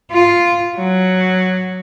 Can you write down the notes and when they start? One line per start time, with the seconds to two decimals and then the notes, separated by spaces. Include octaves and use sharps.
0.12 F4
0.76 F#3